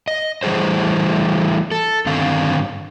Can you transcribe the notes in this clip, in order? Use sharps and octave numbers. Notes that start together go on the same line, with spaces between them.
D#5
E3 G3 A3 G#4 C5
A4
G2 D3 D#3 C4 F5